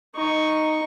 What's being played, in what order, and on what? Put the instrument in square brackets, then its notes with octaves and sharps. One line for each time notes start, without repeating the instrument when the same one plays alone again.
[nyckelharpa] D#4 C#6